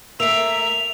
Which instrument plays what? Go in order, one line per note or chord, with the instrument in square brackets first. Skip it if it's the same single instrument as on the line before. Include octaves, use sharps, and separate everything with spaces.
[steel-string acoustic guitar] A3 A#3 [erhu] E5 [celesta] E6 D7 [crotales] F7